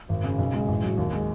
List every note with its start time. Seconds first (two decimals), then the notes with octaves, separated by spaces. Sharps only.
0.09 G#1
0.24 C#3
0.38 B1
0.54 G#3
0.68 A1
0.83 F#3
0.98 D#2
1.13 G#3